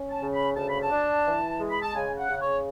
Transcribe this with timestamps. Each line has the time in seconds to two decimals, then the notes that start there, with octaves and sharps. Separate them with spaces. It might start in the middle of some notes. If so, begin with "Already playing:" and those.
Already playing: C#4
0.10 A5
0.21 C#3
0.33 B5
0.56 D2 A5
0.69 B5
0.82 A5
0.90 D4
1.26 E3
1.60 G#3
1.70 B5
1.82 A5
1.95 C#3 G#5
2.18 F#5
2.30 C#3
2.41 C#5